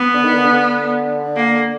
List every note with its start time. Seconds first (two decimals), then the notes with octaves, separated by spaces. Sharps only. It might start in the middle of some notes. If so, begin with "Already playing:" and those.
Already playing: B3
0.14 D3
0.23 D#3
0.33 D3
0.45 D3
1.36 A#3